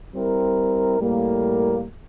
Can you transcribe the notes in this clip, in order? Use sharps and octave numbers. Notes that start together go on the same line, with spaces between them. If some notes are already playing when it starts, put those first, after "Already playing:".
G3 C4 E4 A#4
A2 G3 A#3